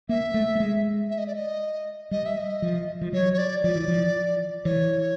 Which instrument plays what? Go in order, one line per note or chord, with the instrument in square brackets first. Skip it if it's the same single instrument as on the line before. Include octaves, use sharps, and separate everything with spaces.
[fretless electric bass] A#3 [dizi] E5
[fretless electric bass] A3
A3
G#3
[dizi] E5
D#5
D5
D#5
[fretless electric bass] G3 [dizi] D#5
[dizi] E5
D#5
[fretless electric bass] F3
F3
[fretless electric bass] F#3 [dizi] C#5
[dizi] C#5
D5
[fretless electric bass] F3 [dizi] D5
[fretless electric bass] E3
F3
[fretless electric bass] E3 [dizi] C#5